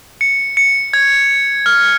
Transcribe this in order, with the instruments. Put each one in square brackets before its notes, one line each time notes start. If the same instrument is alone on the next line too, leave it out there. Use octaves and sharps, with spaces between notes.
[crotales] C#7
C#7
G#6
F6